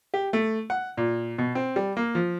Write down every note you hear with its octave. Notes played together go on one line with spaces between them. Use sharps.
G4
A3
F#5
A#2
B2
C4
G3
A#3
F3